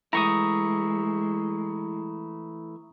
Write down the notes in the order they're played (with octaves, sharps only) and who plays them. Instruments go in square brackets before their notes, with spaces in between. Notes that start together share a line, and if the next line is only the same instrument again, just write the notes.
[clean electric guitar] E3 A3 E4 [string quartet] G#3 [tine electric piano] A#5 C#6 D#6